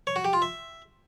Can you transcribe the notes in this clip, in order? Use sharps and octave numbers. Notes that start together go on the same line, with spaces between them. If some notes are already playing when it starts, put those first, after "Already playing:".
C#5
F#4
G4
F4
E5